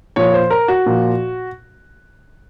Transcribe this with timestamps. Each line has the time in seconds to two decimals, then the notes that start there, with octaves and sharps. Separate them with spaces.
0.16 A#2 F3 C#5
0.34 C5
0.50 A#4
0.68 F#4
0.86 A#2 F3